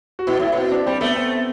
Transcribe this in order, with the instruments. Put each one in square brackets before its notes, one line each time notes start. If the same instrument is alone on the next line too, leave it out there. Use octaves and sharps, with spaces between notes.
[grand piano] F#4
[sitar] B2 [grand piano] E4
[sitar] A2 [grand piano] E4
[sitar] B2 [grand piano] C4
[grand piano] D4
[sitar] G3 [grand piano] C4
[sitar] A3 [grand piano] B3
[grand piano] C4